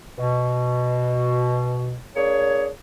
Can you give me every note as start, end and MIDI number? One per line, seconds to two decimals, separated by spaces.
0.18 1.97 47
2.16 2.68 58
2.16 2.68 62
2.16 2.68 68
2.16 2.68 73